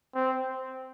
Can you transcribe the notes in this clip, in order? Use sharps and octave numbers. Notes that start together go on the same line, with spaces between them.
C4